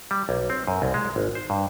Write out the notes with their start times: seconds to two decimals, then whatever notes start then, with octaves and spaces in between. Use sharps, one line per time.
0.11 G3
0.29 B1
0.50 C4
0.67 F#2
0.82 C2
0.94 G#3
1.16 G#1
1.35 C5
1.50 G2